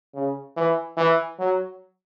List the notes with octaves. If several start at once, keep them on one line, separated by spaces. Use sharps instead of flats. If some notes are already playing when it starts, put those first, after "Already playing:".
C#3
E3
E3
F#3